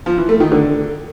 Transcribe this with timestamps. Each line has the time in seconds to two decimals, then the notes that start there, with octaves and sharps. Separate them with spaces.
0.06 F3
0.18 E3
0.29 A3
0.40 D#3
0.52 D3